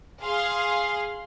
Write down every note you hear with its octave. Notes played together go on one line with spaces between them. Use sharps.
G#4 F5 C6